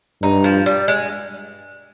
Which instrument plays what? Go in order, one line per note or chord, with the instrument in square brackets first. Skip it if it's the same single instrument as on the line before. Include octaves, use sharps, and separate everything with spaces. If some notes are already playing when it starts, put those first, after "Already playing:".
[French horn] G2 [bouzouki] D#4
[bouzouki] F3
G3
G#3